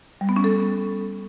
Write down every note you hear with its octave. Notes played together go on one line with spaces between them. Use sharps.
G3
B3
C#4
A4